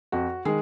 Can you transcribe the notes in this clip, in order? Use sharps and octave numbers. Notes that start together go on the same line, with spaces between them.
F2 F#4
D#3 G#3 G#4